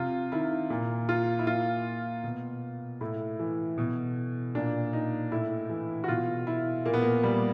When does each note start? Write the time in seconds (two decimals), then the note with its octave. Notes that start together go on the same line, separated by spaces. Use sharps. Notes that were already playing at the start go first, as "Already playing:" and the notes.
Already playing: C3 F4
0.32 D#3 E4
0.70 A#2
1.09 F4
1.39 E4
1.47 A#2 F4
2.24 B2
3.01 A2 E4
3.39 E3
3.78 B2
4.55 A#2 D4
4.93 D#4
5.32 A2 E4
5.69 E3
6.04 F#4
6.08 B2 F4
6.47 E4
6.86 A#2 A#3
6.94 B3
7.02 A#3
7.24 G3